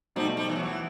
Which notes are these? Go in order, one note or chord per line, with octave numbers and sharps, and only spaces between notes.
B2 G3 A3 D#4 F#4 C5
G3
E3
F#3
E3